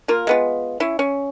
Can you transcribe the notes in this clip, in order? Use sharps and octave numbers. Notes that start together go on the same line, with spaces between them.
A#3 F4 A#4
G#3 B3 F4
C#4 E4
C#4